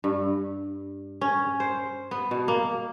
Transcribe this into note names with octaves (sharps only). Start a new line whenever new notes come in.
G2
C#4
C5
B3
B2
A#3